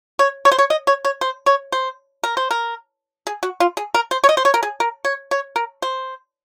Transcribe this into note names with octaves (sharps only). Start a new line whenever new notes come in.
C#5
C#5
C5
C#5
D#5
C#5
C#5
C5
C#5
C5
A#4
C5
A#4
G#4
F#4
F4
G#4
A#4
C5
C#5
D#5
C5
C#5
A#4
G#4
A#4
C#5
C#5
A#4
C5